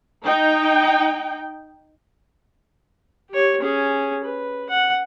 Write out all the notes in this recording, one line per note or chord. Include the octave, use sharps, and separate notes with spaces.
D#4 G5
G4 C#5
C#4 G#4
B4
F#5